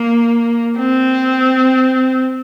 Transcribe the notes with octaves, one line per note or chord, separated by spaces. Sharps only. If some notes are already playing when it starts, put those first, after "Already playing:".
Already playing: A#3
C4